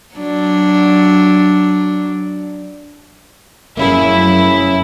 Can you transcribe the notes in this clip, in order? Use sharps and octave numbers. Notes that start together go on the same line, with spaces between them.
F#3 D4
F1 F#2 A#3 C#4 E4 G#4